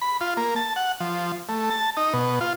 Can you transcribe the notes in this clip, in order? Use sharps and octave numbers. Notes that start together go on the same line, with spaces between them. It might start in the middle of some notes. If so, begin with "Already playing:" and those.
B5
F4
A#3
A5
F#5
F3
A3
A5
D#4
B2
F4